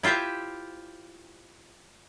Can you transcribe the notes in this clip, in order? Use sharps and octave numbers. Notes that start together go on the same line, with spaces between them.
E4 F4 G4 C5 E5